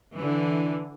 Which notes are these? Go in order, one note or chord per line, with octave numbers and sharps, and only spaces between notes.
D3 E3